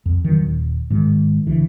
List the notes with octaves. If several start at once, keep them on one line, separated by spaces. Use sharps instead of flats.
F2
D#3 F#3
D#1
G#2 D#3
C#2 D3 E3